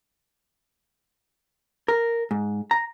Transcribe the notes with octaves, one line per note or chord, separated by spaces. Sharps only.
A#4
G#2
A#5